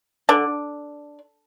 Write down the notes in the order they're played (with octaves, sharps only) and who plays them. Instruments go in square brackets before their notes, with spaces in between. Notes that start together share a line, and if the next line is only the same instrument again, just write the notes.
[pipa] D3 D4